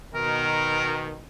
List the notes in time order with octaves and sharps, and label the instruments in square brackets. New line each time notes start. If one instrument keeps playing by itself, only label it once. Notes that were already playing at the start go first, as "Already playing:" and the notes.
[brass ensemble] B2 D#3 [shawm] A#4